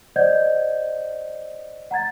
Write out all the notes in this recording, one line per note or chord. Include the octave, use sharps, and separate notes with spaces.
C5 D5 D#5 F#5 G6 G#6
F#5 A#5 G#6 A6